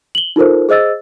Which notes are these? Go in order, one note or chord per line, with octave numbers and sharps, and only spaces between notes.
F#7 G7
D#4 F4 A4 A#4 C5
G#4 C5 D#5 E6 A6